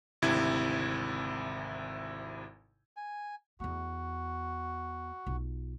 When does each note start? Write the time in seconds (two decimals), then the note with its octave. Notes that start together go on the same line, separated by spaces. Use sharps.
0.22 G#1 D2 C3 E4 G#6
2.96 G#5
3.60 E2 B3 F#4
5.26 B1 F4